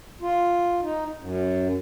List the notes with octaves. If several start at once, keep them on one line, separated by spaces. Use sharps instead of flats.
F4
D#4
F#2